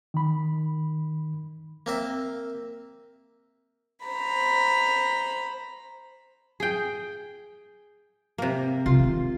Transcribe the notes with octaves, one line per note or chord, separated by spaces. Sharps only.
D#3 B5
A#3 C4 E5
C5 A#5 B5
G#4 G5
C3 A#3
C3 F4
D#3 G#3